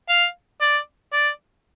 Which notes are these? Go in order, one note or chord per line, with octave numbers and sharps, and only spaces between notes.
F5
D5
D5